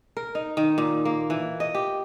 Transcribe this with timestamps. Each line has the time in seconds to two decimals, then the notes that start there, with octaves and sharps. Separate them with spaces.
0.17 A#4
0.35 D#4
0.57 D#3
0.78 A#2
1.05 A#3
1.30 E3
1.60 D#5
1.75 G4